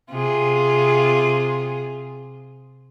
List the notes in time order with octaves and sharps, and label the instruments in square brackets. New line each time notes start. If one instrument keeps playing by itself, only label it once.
[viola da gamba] C3 F4 G#4